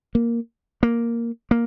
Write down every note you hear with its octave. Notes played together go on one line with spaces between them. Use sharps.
A#3
A#3
A#3